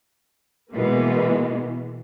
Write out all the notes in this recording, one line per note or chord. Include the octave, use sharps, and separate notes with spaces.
B2 E3 G#3 A#3 B3